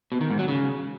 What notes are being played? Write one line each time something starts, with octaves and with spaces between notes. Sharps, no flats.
B2
D#3
G#2
F#3
C#3